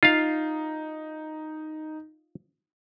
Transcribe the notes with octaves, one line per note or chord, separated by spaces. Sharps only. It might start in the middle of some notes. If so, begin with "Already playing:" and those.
D#4 F4 F5